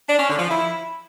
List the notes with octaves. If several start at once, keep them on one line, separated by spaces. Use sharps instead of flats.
D4
C#4
D3
F3
E4